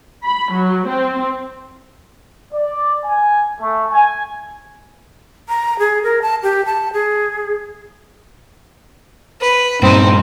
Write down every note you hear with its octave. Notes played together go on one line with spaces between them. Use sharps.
B5
F#3
C4
D5
G#5
A3
G#5
A#5
G#4
A#4
A5
G4
A5
G#4
B4
G2 A#2 C4 D#4